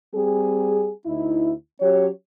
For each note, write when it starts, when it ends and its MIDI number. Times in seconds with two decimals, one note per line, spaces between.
0.14 0.90 55
0.14 0.90 60
0.14 0.90 68
1.05 1.52 38
1.05 1.52 63
1.05 1.52 64
1.81 2.08 54
1.81 2.08 61
1.81 2.08 67
1.81 2.08 73